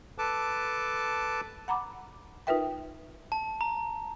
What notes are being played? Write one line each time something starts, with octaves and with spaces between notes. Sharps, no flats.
A4 B4 A5 D6
F#5 A#5 B5 D6
D#4 F4 A#4 B4 E5 G5
A5
A#5